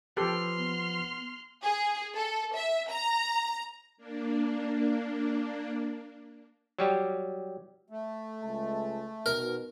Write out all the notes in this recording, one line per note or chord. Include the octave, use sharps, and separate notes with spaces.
F3 G4 A4 B4 C6 F6
B3
G#4
A4
E5
A#5
A#3 D4
F#3 G3 G4
A3
C#2 G#3 A5
B2 D#3 A#4